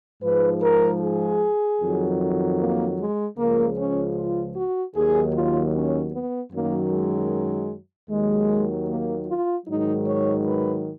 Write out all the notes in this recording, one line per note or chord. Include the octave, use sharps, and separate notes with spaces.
G#2 F3 B4
A#4
G#4
F2 D#3 F#3
A#3
G#3
C#2 C#3 F3 A#3
C#4
F4
F#4
D#2 D#3 F#3 G#4
F4
C#4
B3
F#2 D#3 F#3 A#3
G#3
D#2 D#3 F#3 G#3
A#3
F4
G#2 D#3 F#3 D#4
C#5
B4